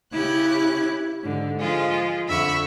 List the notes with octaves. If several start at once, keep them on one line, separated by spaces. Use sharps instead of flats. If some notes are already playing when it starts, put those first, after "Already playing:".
C#3 E4 G4 F#6 G#6
G#2 D3
F3 G#3 F4
F2 D3 E5 B5 C#6